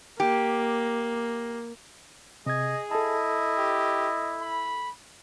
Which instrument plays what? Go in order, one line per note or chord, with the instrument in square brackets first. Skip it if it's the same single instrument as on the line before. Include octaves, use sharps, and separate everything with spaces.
[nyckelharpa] A#3 [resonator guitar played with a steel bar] G4
[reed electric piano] C3 G#6 [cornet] G#4 [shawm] D#5
[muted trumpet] E4 [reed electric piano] A4 A5 [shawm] D#5
[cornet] G4
B5